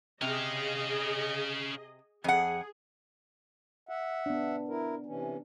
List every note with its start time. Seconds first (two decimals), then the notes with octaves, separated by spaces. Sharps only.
0.21 C3 C#4 G#4 D#5 F5
2.24 F2 G#4 F#5
3.89 E5 F#5
4.26 B3 D4
4.68 E4 A#4
5.06 C3 E3 C#4